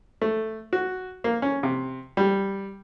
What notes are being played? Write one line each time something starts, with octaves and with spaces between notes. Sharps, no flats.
A3
F#4
A#3
C#4
C3
G3